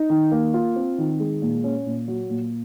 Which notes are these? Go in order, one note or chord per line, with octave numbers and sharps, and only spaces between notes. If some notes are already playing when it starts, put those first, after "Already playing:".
Already playing: D#4
D#3
A#3
F4
C4
D#3
G#3
A#2
C#4
A#2
F#3
A#2